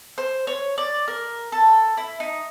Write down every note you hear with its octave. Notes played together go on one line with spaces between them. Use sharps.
C5
C#5
D5
A#4
A4
E4
D#4